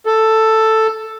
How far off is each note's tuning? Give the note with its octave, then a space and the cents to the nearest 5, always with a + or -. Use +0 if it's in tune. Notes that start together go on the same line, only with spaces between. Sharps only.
A4 +5